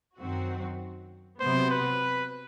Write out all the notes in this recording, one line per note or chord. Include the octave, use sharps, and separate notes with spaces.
F#2 D#3 F#3 C4 F#4
C3 F#3 B3 C5
B4